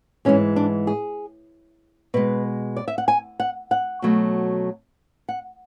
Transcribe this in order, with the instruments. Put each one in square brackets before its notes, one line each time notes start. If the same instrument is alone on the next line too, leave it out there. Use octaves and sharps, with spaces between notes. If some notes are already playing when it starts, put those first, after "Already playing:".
[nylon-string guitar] G#2 E3 G#3 C#4
D4
G#4
B2 G#3 B4
D5
E5
F#5
G#5
F#5
F#5
B2 F#3 A3
F#5